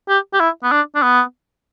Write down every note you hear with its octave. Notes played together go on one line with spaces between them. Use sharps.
G4
G4
E4
B3
D4
D4
B3